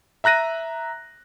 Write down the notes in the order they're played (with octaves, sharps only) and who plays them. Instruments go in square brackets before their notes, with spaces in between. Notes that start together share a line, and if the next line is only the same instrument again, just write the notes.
[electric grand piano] E5 A#5 F#6 A#6 D#7